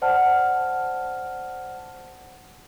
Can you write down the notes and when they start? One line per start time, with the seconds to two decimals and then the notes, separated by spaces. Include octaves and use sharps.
0.02 C5 D5 F#5 A5 F6